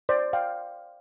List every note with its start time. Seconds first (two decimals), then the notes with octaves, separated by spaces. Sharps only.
0.09 C5 D5
0.33 F5 G5